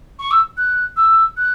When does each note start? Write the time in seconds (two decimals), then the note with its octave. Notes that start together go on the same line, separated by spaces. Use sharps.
0.19 C#6
0.31 E6
0.57 F#6
0.96 E6
1.37 F#6